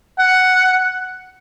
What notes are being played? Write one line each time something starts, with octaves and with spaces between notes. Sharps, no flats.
F#5